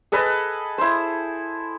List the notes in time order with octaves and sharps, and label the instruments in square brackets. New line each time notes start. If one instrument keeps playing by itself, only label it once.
[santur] G#4 A4 B4 D#5
E4 C5